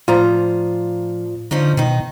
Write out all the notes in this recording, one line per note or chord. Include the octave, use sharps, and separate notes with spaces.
A2 F3 F4 D5 A#5
D3 F3 C#4 D#4
B2 D#3 D#4